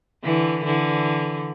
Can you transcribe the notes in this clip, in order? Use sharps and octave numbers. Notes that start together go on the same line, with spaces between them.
D3 E3
D3 E3